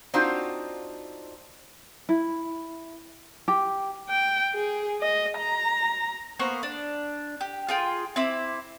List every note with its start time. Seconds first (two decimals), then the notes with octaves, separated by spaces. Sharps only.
0.14 C4 D4 D#4 F4 F#4 C5
2.09 E4
3.48 G4
4.09 G5
4.54 G#4
5.02 D#5
5.38 A#5
6.39 A#3 B3 C5 C#6
6.63 D4
7.41 G4
7.69 F4 G#4 G5
8.16 C4 E4 D6